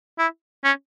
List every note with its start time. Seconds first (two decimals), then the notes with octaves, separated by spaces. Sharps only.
0.19 E4
0.64 C#4